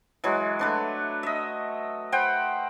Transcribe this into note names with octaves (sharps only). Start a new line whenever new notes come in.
E3 F#3 G#3
A3 D4 B4
D#5 E5
C5 F#5 G5 B5